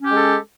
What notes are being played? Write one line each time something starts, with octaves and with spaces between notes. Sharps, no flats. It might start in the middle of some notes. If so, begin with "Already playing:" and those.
G#3 C#4 G4 A4